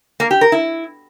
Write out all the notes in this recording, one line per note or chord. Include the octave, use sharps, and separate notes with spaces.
A#3
G4
A#4
E4